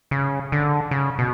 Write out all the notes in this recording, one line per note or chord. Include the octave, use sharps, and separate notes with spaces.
C#3
D3
C#3
B2